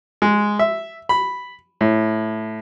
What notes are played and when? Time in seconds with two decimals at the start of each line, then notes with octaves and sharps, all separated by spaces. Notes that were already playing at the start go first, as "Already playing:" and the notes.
0.22 G#3
0.59 E5
1.09 B5
1.81 A2